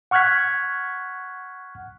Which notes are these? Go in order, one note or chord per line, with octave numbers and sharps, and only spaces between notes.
F#5 C#6 F6 F#6 G#6 B6